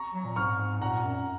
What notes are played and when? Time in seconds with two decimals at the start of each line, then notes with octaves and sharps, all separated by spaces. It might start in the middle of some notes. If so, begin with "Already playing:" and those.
Already playing: A#5 C#6
0.14 F#3
0.25 A#2
0.36 G#2 C#6 F6
0.82 A#2 F#5 A#5
1.04 F#2